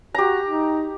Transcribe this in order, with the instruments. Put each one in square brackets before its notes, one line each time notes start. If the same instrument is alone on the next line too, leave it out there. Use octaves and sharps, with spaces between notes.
[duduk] F#4 [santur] G4 A#5
[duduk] D#4